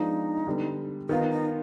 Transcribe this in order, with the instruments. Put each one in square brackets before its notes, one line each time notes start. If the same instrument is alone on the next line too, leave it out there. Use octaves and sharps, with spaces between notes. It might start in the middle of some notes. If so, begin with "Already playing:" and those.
Already playing: [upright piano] F3 G#3 B3 D4 [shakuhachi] D#4
[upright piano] D3 G3 B3
[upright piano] D#3 B3 F4 [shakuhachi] D#4
[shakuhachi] D#4